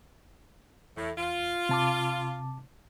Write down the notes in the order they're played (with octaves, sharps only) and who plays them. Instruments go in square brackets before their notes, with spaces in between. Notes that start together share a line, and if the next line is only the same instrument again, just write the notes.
[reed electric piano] E2 [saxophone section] A2
[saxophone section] F4
[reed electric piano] C3 A5 D6